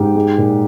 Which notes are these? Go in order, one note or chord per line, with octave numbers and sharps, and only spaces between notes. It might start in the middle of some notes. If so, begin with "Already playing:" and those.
Already playing: G#2 G4
G#3
A#2